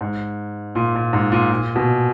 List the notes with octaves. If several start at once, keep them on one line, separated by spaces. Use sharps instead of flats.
G#2
A#2
A#2
G#2
A#2
A#2
B2